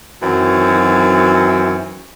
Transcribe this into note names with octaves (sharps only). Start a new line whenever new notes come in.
F#2 D#3 E3 F#3 C4